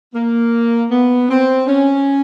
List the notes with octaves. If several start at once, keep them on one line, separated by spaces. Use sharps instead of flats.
A#3
B3
C4
C#4